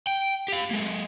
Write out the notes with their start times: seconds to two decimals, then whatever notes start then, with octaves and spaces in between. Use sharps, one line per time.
0.07 G5
0.48 G4 F5
0.71 G#3 A#3